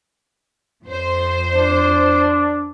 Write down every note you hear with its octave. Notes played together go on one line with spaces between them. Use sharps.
F2 C5
D4